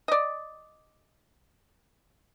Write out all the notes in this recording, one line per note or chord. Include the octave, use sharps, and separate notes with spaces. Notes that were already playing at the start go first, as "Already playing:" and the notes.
D5 D#5